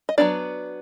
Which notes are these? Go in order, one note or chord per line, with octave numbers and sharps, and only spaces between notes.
D#5
F#3 B3 D4 D5